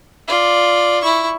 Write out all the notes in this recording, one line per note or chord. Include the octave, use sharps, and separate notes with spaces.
F4 D5
E4 C#6